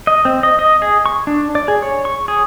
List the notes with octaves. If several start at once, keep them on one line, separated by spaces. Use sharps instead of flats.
D#5
C4
D#5
D#5
G#4
C#6
D4
D5
G#4
C#5
C#6
G#4